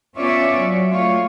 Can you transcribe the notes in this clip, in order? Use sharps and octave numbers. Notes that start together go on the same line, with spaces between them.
B3 C#4 F4 C#5 D5 E5
F#3
A3 F4 C#5